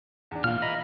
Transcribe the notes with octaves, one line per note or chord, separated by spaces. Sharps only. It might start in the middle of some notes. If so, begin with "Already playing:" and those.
E2 D4
A#2 E3 F4 F5 F6
D#5 A#5 B5